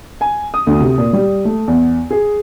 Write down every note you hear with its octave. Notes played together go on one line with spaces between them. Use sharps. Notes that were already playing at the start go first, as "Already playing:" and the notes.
G#5
D#6
D2
C3
A#2
G3
A3
E2
G#4